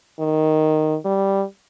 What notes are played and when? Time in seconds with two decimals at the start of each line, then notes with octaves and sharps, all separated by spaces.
0.20 D#3
1.05 G3